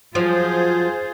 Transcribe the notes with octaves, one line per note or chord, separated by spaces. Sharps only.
F3 F#3 F4 G#4 C5